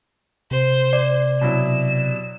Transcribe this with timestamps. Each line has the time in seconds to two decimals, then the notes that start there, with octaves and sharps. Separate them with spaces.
0.51 C3 C5
0.93 D5
1.41 B2 F#3 E4 E7